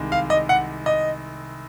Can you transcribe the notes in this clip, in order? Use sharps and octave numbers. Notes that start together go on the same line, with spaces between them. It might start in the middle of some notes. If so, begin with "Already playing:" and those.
Already playing: C2 C3 D#3 G#3
F5
D#5
F#5
D#5